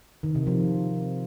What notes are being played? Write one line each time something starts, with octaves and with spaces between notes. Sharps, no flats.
D#3
C3
F3